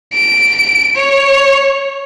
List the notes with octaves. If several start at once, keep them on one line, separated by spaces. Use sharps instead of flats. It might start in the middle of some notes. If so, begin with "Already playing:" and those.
D7
C#5